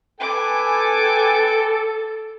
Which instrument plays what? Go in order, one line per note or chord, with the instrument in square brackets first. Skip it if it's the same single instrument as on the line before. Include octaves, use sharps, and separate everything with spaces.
[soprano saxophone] A4 [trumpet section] B4 G5 G#5 [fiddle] D6